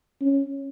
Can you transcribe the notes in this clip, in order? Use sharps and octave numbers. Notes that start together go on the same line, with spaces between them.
C#4